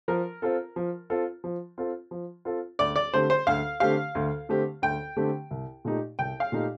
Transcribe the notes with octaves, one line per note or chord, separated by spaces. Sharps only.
F3 A#4
C4 F4 A4
F3
C4 F4 A4
F3
C4 F4 A4
F3
C4 F4 A4
D2 D5
D5
D3 A3 C4 G4 C5
C5
D2 F5
D3 A3 C4 G4 F5
D2
D3 A3 C4 G4
D2 G5
D3 A3 C4 G4
C2
A#2 A3 D#4 G4
C2 G5
F5
A#2 A3 D#4 G4